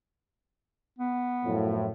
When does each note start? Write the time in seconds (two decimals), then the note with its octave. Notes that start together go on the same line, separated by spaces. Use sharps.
0.98 B3
1.44 F#2 A2 F3